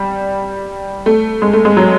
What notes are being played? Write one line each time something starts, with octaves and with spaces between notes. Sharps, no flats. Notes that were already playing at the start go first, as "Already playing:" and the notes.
Already playing: G3
A3
G#3
A3
G#3
F#3